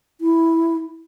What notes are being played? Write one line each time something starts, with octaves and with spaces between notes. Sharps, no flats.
E4